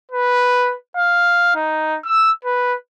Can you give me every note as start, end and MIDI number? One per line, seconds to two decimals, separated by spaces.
0.12 0.75 71
0.97 1.54 77
1.55 1.98 63
2.05 2.29 88
2.45 2.75 71